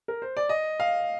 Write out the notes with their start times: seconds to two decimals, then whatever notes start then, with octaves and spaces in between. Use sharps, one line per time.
0.08 A#4
0.22 C5
0.37 D5
0.49 D#5
0.80 F5